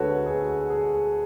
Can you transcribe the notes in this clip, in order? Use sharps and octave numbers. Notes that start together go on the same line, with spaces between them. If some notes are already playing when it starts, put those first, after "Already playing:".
Already playing: D2 D3 G#3 F#4 A4 B4 C#5
G#4
G#4